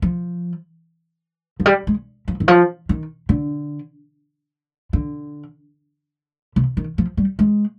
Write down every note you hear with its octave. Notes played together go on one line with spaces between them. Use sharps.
F3
F3
G3
G#3
F3
D#3
F3
D#3
D3
D3
C3
D#3
F3
G3
G#3